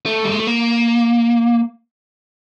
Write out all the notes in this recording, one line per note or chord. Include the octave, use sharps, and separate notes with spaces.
A3
G3
G#3
A3
A#3